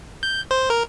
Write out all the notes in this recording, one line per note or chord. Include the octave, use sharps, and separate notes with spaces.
G6
C5
A#4